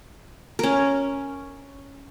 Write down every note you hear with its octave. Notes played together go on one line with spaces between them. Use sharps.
C#4 A#4